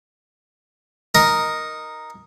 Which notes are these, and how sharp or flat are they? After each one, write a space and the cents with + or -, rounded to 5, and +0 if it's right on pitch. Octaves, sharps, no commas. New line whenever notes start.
D#4 +0 A#4 +0